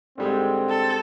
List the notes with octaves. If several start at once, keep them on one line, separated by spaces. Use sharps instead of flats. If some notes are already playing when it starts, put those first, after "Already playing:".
G#2 D3 G3 G#3 C4
A4